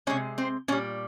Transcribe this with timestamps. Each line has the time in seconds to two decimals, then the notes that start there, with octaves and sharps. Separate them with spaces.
0.07 C3 F3 G#3 C#4 C#5
0.38 C4 C5
0.68 A#2 G3 C#4 C#5